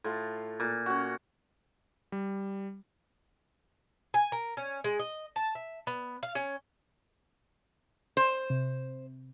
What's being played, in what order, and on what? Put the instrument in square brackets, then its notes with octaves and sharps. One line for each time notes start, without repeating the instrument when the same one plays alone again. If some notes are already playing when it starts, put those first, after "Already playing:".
[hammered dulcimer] A2 F4
A#2
C#4 F#4
[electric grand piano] G3
[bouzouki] G#5
A#4
C#4
G#3
D#5
A5
E5
B3
F5
C#4
[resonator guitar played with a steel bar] C5
[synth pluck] C3